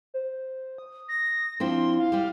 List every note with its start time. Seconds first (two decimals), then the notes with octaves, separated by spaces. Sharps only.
0.14 C5
0.78 D#6
1.09 A#6
1.60 F3 C4 D4 E4 C6
1.99 F5
2.12 G3 G4